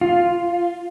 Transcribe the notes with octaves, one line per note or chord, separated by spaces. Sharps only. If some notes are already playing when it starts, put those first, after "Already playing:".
F4